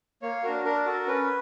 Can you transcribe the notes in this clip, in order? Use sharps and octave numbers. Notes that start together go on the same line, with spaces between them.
A#3 C#5
D4 F#4 A#4
D4 A#4
F#4 A4
C#4 B4